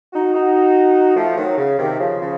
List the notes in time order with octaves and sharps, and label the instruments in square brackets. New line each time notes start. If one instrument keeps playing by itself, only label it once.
[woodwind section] D#4 F#4
D#4 F#4
F3 A3
D#3 F#3
C#3
C3 D#3
C#3 F3
C#3 F3